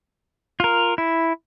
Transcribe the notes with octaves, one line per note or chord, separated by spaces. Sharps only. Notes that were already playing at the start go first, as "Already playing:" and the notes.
F4 A#4
E4